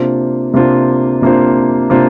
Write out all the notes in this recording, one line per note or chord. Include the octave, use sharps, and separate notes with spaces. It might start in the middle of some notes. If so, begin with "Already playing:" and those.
Already playing: C3 A#3 D4 F4 C5
C3 A#3 D4 F4 C5
C3 A#3 D4 F4 C5
C3 A#3 D4 F4 C5